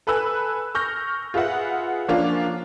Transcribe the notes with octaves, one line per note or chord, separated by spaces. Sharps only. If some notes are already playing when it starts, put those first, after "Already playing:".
A4 B4 G#5 E6 F#6
C#6 F6 G6 A#6
F4 G#4 B4 E5 F#5
F3 A#3 C#4 D4 F4